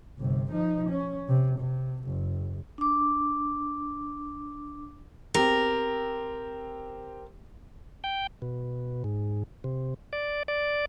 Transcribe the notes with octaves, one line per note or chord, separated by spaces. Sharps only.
G1 C3
F3 D#4
C#4
C3
C3
F#1
D4 D6
C4 G4 A#4
G5
B2
G#2
C3
D5
D5